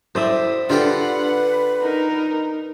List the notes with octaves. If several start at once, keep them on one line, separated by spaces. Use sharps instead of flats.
A2 C5 D5 E5 D#6
D3 F4 G4 A4 B4 F#5
D#4 A#4